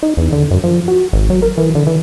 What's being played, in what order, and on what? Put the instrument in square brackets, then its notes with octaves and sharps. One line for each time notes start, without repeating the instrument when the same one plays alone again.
[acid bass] D#4
E2
D3
F#2
F3
F#4
G#1
F#3
A#4
E3
D3
E3